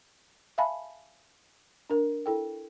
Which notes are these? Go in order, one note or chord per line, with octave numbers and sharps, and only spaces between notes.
E5 F5 G#5 A5 B5
D4 A#4
E4 A4 G5